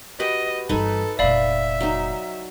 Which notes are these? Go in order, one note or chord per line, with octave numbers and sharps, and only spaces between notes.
F#4 G4 B4 D#5
G1 E3 D#4 A4 B4 G#5
F1 A#2 D5 E5 F5 B5
F#3 D#4